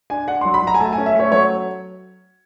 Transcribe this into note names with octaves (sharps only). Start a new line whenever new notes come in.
D4 G#5
D4 F#5
F#3 C6
B5
F#3 A#5
G#5
A3 A5
G#5
C#4
E5
A3 C#5
F#3 C#5